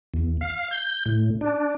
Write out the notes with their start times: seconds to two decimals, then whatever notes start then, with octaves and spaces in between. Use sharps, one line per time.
0.14 E2
0.41 F5
0.71 G6
1.06 A2
1.41 D4